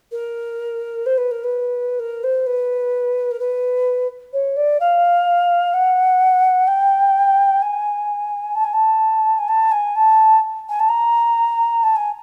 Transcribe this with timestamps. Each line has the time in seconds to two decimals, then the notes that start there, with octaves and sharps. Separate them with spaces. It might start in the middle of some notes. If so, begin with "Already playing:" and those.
0.11 A#4
1.06 C5
1.17 B4
1.31 A#4
1.43 B4
1.99 A#4
2.23 C5
2.46 B4
3.31 A#4
3.39 B4
4.33 C#5
4.56 D5
4.80 F5
5.73 F#5
6.67 G5
7.62 G#5
8.55 A5
8.64 G#5
8.73 A5
9.38 G#5
9.48 A5
9.71 G#5
9.95 A5
10.69 G#5
10.79 A5
10.88 A#5
11.83 A5
11.96 G#5